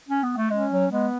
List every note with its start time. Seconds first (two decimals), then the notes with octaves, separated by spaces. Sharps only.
0.08 C#4
0.23 B3
0.37 A3
0.50 G#3 C#4
0.71 F#3
0.91 G#3 B3